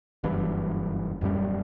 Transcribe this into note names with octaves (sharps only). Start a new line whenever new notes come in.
F#1 G2 E3
D#1 F#2 F3 G3